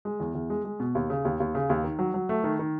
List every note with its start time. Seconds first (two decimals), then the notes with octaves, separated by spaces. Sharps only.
0.05 G#3
0.20 E2
0.35 E2
0.50 G#3
0.65 G#3
0.80 B2
0.95 D#2
1.10 C#3
1.25 D#2
1.40 D#2
1.55 C#3
1.70 D#2
1.84 D#3
1.99 F#3
2.14 F#3
2.29 A3
2.44 D#3
2.59 D#3